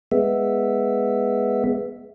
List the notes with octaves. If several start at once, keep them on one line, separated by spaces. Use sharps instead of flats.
G#3 B3 E5